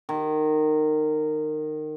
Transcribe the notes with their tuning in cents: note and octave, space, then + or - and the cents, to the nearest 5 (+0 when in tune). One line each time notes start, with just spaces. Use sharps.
D#3 -20